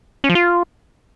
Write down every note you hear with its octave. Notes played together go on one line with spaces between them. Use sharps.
C#4
F3
F4